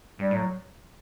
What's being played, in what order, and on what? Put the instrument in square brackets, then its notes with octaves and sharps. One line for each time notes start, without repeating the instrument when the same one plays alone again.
[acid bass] G2 [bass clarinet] G3
[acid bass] A2 [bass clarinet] F#3